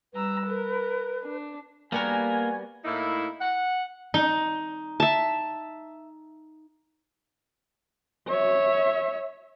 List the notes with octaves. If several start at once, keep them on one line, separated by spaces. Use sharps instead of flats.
G3 B4 A#5 E6
A#4
D4
G3 A#3 B3 F#4 A#4 G#5
A2 A#3 D#4 E4
F#5
D#4
E5 A5
C#5 E5